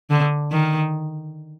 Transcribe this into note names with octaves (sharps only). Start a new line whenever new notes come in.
D3
D#3